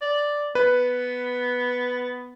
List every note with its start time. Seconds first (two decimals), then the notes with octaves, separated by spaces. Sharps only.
0.02 D5
0.55 B3 B4